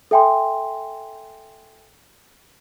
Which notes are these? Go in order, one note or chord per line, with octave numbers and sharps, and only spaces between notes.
A4 E5 G5 G#5 C6